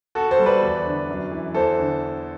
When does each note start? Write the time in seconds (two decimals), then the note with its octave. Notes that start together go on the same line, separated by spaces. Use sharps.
0.15 B2 F#4 A4
0.31 A4 C5
0.39 G3
0.46 B4 D5
0.62 E2
0.86 D3
1.09 F#2
1.31 E3
1.54 E2 A4 C5
1.79 D3